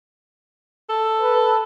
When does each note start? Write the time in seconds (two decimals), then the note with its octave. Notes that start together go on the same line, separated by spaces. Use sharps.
0.89 A4
1.20 B4